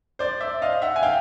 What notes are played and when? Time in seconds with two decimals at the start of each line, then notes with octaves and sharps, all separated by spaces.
0.19 C5 D5
0.40 D5 E5
0.62 D#5 F5
0.82 E5 F#5
0.96 G#5
1.03 F5 G5